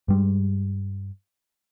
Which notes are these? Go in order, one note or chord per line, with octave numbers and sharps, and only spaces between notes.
G2 G3 G#3